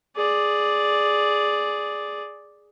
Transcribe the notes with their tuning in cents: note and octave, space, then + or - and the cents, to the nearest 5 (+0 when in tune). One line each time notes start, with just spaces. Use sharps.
G#4 +0 D5 +0